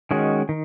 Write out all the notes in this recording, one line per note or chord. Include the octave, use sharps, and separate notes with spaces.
D#3 G#3 C#4 F#4
D#3